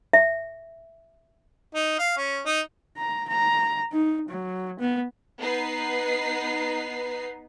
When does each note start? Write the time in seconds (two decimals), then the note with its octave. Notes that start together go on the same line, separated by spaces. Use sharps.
0.13 E5
1.75 D#4
1.99 F5
2.17 C#4
2.46 D#4
2.97 A#5
3.28 A#5
3.92 D#4
4.29 F#3
4.79 B3
5.40 B3 D#4 B4 C7